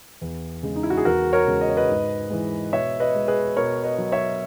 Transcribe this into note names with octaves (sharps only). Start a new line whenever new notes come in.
E2
C#3 G#3
D#4
E4
F#4
G#4
E2 F#4 A#4
A#4 C#5
C#3 G#3
D#5
C#5
B4 D#5
G#2
E3 G#3
B2 C#5 E5
B4 D#5
G#3
G#4 B4
B2 A#4 C#5
B4 D#5
F#3
C#5 E5